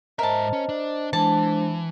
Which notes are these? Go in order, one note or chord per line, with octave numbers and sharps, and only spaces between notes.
G#2 A#4 C5 D#5 E5 A5
C#4
D4
E3 G#3 D4 C5 A5